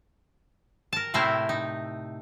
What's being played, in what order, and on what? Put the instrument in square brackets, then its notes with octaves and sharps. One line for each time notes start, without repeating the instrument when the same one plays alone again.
[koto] A#4 A5
A2 C3 A3 C4 E4 A#4
D#4